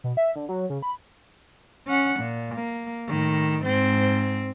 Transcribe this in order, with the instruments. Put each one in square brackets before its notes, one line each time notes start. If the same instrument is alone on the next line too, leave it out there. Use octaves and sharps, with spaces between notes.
[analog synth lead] B2
E5
D3
F#3
C#3
B5
[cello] C#4 F#5
A#2
A#3
A2 D#3
G#2 C4